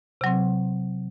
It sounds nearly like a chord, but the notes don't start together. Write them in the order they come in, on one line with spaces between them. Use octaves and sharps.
C3 F#3 C4